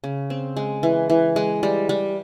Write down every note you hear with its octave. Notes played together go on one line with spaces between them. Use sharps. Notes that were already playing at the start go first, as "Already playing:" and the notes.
C#3
C4
G#3
E3
E3
G#3
G3
G3